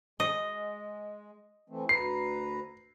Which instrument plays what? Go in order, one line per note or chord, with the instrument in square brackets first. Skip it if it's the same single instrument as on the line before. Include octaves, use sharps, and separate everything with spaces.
[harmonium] G#3 [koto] D#5
[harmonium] E3 A3 C4
[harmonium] D2 B4 A#5 [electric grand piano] C7